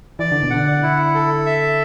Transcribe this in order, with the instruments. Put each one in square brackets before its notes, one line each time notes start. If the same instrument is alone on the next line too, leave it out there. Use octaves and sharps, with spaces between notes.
[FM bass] E3 [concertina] D5
[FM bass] D3
B2
[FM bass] D3 [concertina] F#5
[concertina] E4
A4
E5